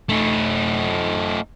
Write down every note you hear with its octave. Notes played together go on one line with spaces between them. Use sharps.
A3 D#4